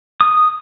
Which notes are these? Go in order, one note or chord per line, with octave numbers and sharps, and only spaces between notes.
D#6